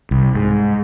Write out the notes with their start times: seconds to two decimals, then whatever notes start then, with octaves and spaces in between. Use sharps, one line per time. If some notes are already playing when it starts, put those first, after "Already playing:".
0.11 C2
0.35 G#2